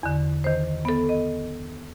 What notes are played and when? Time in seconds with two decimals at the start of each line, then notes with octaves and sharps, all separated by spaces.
0.03 E2 D3
0.44 D#3 C5
0.85 B3 A4
1.09 D#5